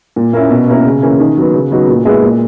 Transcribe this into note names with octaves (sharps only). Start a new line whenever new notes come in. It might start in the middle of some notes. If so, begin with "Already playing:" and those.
A#2
A#3 C#4 E4
B2
A#3 C#4 E4 A#4
C#3
E3 A#3 C#4
D#3
F#3 B3
C#3
F#3 B3 D#4 F#4
A#2
G#3 B3 E4 G#4
A#2